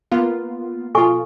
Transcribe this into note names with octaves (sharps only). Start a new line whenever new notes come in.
A#3 B3 F4
B2 F4 A4 G#5 C#6